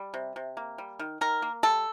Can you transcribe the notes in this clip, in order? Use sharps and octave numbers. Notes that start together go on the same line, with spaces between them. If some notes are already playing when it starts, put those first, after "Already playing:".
Already playing: G3
C3
C3
A#3
G3
D#3
D#3 A#4
A#3
G3 A4